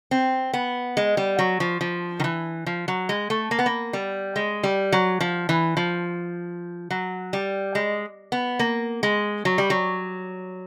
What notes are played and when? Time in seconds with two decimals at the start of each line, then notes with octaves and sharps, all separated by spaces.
0.11 C4
0.53 B3
0.97 G#3
1.17 G3
1.39 F#3
1.60 F3
1.81 F3
2.20 D#3
2.24 E3
2.66 F3
2.88 F#3
3.09 G#3
3.30 A3
3.51 A#3
3.59 B3
3.66 A#3
3.93 G3
4.36 G#3
4.63 G3
4.92 F#3
5.20 F3
5.49 E3
5.77 F3
6.90 F#3
7.33 G3
7.75 G#3
8.32 B3
8.59 A#3
9.03 G#3
9.45 F#3
9.58 G3
9.70 F#3